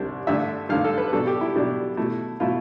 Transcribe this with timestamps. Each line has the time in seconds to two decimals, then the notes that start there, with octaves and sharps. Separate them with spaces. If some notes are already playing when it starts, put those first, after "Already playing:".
Already playing: C2 C3 G3 D4
0.27 G2 D3 A3 D4 E5
0.69 G2 D3 A3 D4 F5
0.84 A4
0.98 B4
1.13 B2 G3 D4 A4
1.27 G4
1.41 E4
1.56 B2 G3 D4
1.97 B2 A3 E4
2.40 B2 A3 E4 F4